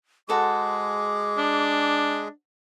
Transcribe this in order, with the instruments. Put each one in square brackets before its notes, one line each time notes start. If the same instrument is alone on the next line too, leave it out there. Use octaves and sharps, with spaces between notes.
[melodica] G#3 G#4 [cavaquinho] F#4 A4 C5 [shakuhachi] D6
[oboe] D4